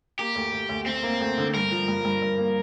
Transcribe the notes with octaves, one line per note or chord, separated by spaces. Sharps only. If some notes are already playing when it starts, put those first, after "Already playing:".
A#3 G4
D2
D2
D2
D2 C4
A#3
D2
D3
G2 A#4
F3
G2
G2
G2
A#3